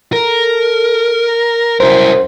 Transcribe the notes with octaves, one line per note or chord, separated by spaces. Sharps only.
A4 A#4
F#2 E4 A#4 C5